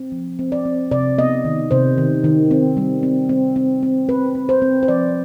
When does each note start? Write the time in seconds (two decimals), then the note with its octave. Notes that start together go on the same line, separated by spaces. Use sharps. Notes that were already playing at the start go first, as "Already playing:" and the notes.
Already playing: C4
0.12 F3
0.39 C4
0.52 D5
0.65 C4
0.91 C3 D5
1.18 B3 D#5
1.45 D#3
1.71 C3 C5
1.98 D#3
2.24 D#3
2.51 C4
2.77 G3
3.03 C4
3.29 C4
3.56 C4
3.83 C4
4.09 C4 B4
4.35 C4
4.49 C5
4.62 C4
4.83 C5
4.88 F3 D5